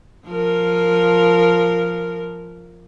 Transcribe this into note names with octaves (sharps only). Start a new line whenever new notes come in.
F3 A#4